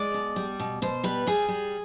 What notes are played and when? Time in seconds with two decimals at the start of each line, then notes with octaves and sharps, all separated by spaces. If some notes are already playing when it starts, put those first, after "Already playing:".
Already playing: G#3 D5
0.14 B2
0.36 G3
0.59 B2
0.82 B2 C5
1.03 G3 B4
1.27 G3 G#4
1.48 G3